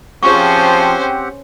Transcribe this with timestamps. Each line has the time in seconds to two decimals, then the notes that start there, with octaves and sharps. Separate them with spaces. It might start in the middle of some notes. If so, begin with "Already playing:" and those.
0.23 F3 C4 C#4 G4 G#4 C5 F#5 C#6